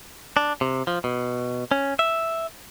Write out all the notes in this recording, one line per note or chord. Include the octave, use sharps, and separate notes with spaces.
D4
C3
F3
B2
C#4
E5